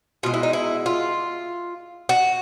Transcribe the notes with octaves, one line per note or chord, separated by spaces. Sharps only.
B2 G#3 F4
E4
D#4
E4
F4
F#4